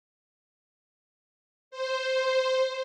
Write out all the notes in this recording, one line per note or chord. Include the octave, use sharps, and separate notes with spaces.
C5